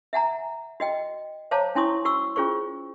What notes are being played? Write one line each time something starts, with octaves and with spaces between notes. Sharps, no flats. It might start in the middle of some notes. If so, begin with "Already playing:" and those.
E5 F#5 G#5 A#5
F#4 D#5 G5
C5 C#5 F5 A5 A#5 D6
C#4 E4 G#5 C6 C#6 D#6
F#4 C#6 E6
C#4 F4 G#4 C5 C#6